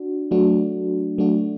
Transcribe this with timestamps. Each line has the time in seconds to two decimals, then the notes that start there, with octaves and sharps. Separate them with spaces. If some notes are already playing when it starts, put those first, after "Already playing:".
Already playing: D4 F#4
0.31 F#3 A3 D4 F#4
1.18 F#3 A3 D4 F#4